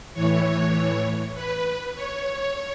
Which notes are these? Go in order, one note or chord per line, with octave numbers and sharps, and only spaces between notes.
A2 E3 C#5
B4
C#5